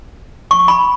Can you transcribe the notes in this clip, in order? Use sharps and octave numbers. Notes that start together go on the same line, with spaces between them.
C#6
B5